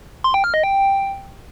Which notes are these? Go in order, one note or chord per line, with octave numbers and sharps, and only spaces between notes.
C6
G5
F6
D#5
G5